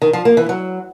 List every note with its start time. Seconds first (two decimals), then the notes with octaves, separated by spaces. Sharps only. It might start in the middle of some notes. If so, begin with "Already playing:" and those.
0.02 D#3
0.13 F3
0.25 A#3
0.37 E3
0.49 F#3